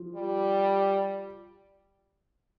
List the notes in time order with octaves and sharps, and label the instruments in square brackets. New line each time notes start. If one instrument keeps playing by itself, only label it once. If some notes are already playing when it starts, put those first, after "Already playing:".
Already playing: [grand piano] F3
[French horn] G3